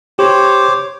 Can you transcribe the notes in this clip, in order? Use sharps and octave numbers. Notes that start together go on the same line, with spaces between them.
G4 C5 C#5 D6